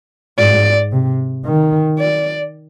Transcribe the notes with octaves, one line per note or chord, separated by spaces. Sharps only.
G#2 D5
C3
D#3
D5